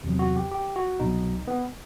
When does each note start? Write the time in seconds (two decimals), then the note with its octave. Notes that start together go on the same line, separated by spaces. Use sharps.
0.04 E2 C3 F#3
0.19 F#4
0.36 G4
0.52 G4
0.76 F#4
1.00 C2 B2 F#3 D#4
1.48 B3